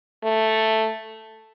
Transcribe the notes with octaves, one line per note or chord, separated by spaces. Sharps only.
A3